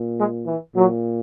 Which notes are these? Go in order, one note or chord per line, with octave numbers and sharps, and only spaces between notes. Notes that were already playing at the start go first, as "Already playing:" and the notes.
Already playing: A#2
G#3
E3
A#2 F#3